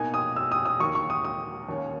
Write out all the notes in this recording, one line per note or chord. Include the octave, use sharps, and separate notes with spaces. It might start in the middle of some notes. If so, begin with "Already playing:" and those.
Already playing: B2 A#3 D#4 G#5
D#6
E6
D#6
D#6
D#2 D#3 A#3 C#6
C#6
D#6
D#6
D#2 D#3 A#3 C#4